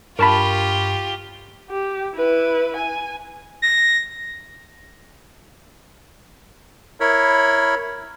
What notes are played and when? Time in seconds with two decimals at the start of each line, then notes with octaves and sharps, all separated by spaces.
0.19 G2 F4 G4 A#4 A5 B5 C#6 F6
1.70 G4
2.16 E4 B4
2.76 G#5
3.62 A#6
7.00 E4 A#4 C#5 B5